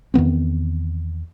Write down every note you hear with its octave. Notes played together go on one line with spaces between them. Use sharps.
E2 D#3 B3 C4